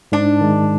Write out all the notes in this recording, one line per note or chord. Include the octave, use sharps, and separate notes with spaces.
G#2 D4
D#3 G#3